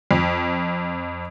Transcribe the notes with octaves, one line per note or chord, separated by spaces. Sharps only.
F2